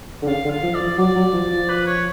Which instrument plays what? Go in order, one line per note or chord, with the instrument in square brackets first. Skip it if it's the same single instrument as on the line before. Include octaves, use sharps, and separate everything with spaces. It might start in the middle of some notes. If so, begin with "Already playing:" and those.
[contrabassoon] D3
[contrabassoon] C#3 [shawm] F5
[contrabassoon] D3
[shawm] F5
[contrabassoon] F3
[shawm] D5
[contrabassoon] F3
[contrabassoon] F#3 [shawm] D5
[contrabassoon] F#3
F3
F3
[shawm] B4
C#5